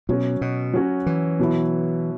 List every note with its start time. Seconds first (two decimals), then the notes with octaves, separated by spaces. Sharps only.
0.09 B2 F#3 C#4 F#4
0.41 B2
0.74 F#3 C#4 F#4
1.06 E3
1.39 B2 F#3 E4